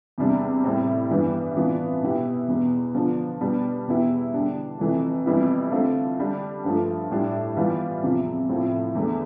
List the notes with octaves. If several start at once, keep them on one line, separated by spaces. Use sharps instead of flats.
E2 C3 G3 D4
A2 G3 C4 G4
G2 E3 G3 B3
C3 E3 B3 D4 F4
B2 B3 E4 G4
E2 B2 B3
D3 F3 B3 D4
B2 G3 B3 D4
E2 B2 B3 E4 G4
D3 G3 D4 G4
F2 C3 E3 A3
F2 E3 G3 B3 E4
D3 A3 C4 F4
D3 G3 D4
G2 F3 A3
A2 G3 D4 G4
E3 G3 B3 F4
E2 C3 F3
A2 F3 C4 F4
E2 D3 A3